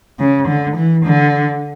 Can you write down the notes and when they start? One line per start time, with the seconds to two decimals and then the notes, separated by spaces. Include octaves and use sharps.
0.20 C#3
0.47 D3
0.76 E3
1.05 D3